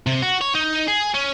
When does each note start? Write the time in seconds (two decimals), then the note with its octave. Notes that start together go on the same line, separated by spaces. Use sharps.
0.07 C3
0.22 F#4
0.41 C#5
0.55 D#4
0.88 G#4
1.15 C#4